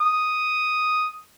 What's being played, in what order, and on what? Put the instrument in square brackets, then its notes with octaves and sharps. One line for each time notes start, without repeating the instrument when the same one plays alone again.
[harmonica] D#6